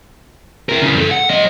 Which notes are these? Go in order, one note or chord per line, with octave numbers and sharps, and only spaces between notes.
E4 A#4
C#3 E3
G2 A4
F#5
F#3 D#5